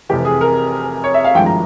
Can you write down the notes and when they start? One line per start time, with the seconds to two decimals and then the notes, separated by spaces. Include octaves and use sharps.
0.09 F1 F2 C3 E3 G4
0.25 G#4
0.41 A#4
1.04 C#5
1.14 E5
1.24 F5
1.35 G#1 G2 F3 G#3 E4 G5
1.46 A#5